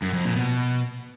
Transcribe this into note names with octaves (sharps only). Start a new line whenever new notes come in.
F#2
F2
A#2
B2